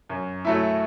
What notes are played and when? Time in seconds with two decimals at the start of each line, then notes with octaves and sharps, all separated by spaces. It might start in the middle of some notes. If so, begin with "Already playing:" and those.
0.09 F#2
0.45 F#3 A3 E4